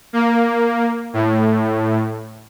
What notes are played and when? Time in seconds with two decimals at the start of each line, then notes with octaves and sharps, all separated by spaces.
0.13 A#3
1.14 A2